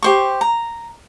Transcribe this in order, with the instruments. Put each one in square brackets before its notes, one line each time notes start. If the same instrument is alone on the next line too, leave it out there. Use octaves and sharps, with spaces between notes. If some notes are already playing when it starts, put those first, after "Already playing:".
[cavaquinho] G4 C5 C#6
A#5